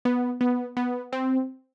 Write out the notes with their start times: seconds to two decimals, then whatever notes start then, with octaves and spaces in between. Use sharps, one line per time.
0.05 B3
0.41 B3
0.77 B3
1.13 C4